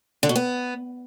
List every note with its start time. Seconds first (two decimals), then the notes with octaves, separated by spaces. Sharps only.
0.23 D3
0.29 B2
0.36 B3